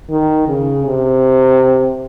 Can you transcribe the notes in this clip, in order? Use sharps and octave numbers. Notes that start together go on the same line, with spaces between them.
D#3
C#3
C3